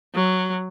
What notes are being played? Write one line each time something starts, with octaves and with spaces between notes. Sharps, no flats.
F#3